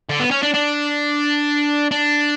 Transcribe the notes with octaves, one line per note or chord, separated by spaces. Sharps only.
D3
B3
C#4
D4
D4
D4